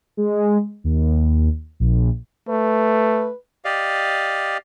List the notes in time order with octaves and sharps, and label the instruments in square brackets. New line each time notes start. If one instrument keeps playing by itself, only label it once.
[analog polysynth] G#3
D#2
A#1
[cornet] A3 [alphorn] B4
[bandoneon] G4 D5 D#5 F5